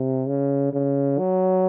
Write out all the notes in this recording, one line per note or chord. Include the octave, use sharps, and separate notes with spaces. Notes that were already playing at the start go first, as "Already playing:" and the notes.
Already playing: C3
C#3
C#3
F#3